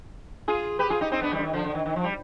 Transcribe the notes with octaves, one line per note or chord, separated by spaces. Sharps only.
F4 G#4
G4 B4
F4 G#4
D#4 G4
C4 D#4
B3 D4
D#3 G3
D3
D#3
D3 F3
D3
D#3
D#3
F3
G3